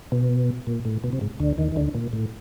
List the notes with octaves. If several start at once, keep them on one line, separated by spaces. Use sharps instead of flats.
B2
A#2
A2
B2
C3
G#2
D2 D3
D#2 D#3
D#3
D2 D3
A#2
A2